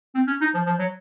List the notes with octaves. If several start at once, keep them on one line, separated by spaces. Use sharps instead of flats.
C4
C#4
D#4
F3
F3
F#3